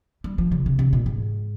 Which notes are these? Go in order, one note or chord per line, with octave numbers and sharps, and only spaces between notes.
G3
F3
C#3
C3
C3
A#2
G#2